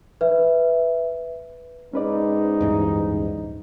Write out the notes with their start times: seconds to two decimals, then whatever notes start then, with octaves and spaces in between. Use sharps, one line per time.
0.21 B4 E5
1.93 G#2 C#4 D#4 B4 D5
2.61 D1 G2 E3